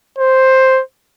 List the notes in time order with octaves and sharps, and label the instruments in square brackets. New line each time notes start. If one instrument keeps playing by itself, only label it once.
[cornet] C5